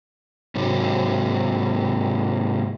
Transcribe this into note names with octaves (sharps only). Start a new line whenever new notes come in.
G#2 C3 F#3